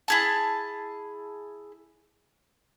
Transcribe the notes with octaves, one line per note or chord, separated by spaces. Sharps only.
E4 G#4 A5